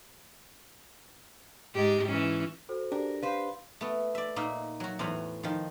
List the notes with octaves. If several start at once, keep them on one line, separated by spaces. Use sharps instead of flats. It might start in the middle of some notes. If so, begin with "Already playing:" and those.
G#2 G#3 G4
E3 C#4
F#4 A4 C5
D4 G4 A#4
B4 C5 F5
A3 B3
D5 E5
A#2 A#3 D#4 E5
F#3 F#4
E2 A2 C5 G#5 A#5 B5
D#3 F3